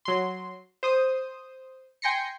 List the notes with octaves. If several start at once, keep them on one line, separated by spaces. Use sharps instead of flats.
F#3 C6
C5 D#6
G5 G#5 C6 A#6 C7 C#7